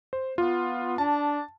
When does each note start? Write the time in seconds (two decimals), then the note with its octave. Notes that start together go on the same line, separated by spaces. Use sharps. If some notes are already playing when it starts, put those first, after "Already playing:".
0.13 C5
0.38 B3 F4
0.98 D4 A5